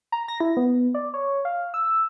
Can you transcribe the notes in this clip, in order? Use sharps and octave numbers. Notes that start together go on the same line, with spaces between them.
A#5
A#6
E4
B3
D5
C#5
F5
E6